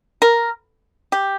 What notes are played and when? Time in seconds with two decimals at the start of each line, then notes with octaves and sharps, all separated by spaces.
0.22 A#4
1.12 G4